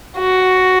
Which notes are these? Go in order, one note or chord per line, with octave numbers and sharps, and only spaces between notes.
F#4